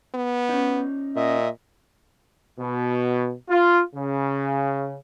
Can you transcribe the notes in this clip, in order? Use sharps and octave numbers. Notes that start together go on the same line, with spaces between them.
B3
C#4 D#4
A#2 D#5 E5
B2
F4
C#3